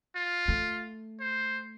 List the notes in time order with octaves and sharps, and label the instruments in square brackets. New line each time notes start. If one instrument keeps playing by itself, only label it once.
[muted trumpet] F4
[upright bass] A3
[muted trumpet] C5